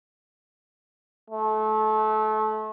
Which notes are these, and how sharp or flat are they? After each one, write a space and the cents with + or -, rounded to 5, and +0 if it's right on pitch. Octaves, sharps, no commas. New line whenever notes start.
A3 -30